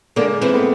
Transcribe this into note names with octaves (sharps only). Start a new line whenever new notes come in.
D3 G#3 A#3 D4
E3 C4 E4
A3 B3